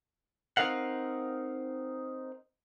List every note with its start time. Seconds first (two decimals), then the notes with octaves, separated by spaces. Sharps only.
0.57 C4 D#4 A#4 F5 F#5